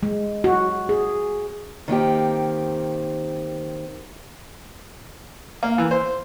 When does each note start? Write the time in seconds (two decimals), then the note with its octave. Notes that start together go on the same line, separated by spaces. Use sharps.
0.03 G#3
0.44 F#4
0.89 G#4
1.88 D#3 A#3 C4 G4
5.63 A#3
5.78 E3
5.91 C5